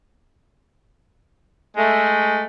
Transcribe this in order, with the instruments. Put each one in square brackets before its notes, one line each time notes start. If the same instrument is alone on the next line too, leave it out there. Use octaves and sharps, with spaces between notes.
[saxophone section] G#3 A3